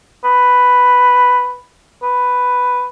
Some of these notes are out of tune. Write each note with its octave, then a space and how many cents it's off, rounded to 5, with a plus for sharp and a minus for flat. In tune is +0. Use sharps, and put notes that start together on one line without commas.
B4 +5
B4 +5